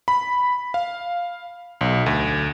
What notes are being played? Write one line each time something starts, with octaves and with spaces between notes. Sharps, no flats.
B5
F5
B1
D2